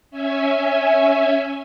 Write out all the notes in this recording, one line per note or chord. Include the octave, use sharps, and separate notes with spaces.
C#4 E5 G#5